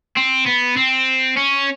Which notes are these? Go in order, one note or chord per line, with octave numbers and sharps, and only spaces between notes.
C4
B3
C4
C#4